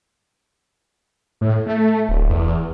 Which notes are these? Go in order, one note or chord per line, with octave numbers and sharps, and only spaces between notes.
A2
A3
D1
E2